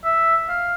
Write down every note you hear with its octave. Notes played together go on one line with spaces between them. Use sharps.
E5
F5